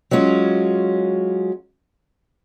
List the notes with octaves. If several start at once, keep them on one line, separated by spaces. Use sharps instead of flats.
F#3 G#3 C#4 F4